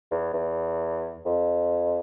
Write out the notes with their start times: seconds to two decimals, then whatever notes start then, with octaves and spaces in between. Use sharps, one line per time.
0.11 E2
0.33 E2
1.25 F2